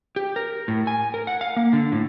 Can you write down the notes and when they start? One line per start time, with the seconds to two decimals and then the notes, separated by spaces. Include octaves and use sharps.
0.16 G4
0.36 A#4
0.68 A2
0.87 G#5
1.14 A#4
1.27 F#5
1.41 F5
1.56 A#3
1.73 D3
1.92 A2